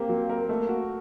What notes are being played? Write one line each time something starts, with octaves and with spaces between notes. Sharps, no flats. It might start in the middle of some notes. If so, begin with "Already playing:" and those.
Already playing: A#3 C4 G4
F#3
A#4
A3 A#3
F#4